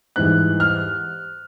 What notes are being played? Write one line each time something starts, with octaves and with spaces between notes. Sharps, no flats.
G#2 E3 G3 F#6
F6